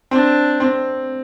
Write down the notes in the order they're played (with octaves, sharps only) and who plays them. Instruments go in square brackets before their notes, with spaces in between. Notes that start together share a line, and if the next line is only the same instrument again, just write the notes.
[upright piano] C4 [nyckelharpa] D4
[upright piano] C4